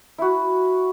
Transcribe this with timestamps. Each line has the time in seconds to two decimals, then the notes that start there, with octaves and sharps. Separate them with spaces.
0.18 E4 F#4